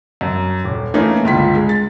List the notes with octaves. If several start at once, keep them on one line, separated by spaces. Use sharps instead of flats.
F#2
D#1
E3 A3 A#3 C#4 D#4
G1 C#2 F4 B6
G#3
A6